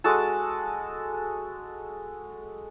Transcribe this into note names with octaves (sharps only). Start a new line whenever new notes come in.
G#3 F#4 A4 A5